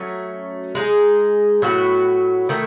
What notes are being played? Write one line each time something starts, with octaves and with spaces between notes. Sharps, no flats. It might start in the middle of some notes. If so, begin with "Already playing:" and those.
Already playing: F#3 A3 C#4
G#3 D#4 G#4
A2 F#3 B3 F#4
D#3 A3 E4 A4